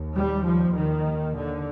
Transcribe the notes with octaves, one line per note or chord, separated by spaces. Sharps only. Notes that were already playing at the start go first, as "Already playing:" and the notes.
Already playing: D#2
G3
F3
D#2 D#3
D3